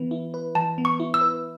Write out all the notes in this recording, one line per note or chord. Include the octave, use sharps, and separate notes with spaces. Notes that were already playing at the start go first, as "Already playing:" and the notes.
Already playing: E3 B3 E4 B4
E4
B4
E3 A5
B3
C#6
E4
E6
B4